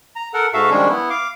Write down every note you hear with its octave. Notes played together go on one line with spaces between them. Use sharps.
A#5
A4 A#4 F#5
G#2 F#4 A4 E5 F5
D#3 F3 G3 G#3 C#4 D4
B3 E4
F5 D6